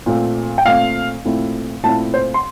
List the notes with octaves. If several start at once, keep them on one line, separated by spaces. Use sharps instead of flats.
A#2 A3 C4
G5
A#2 A3 C4 F5
A#2 A3 C4 E4
A#2 A3 C4 E4 A5
C5
C6